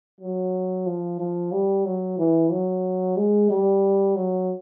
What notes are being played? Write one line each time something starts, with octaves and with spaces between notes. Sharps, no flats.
F#3
F3
F3
G3
F#3
E3
F#3
G#3
G3
F#3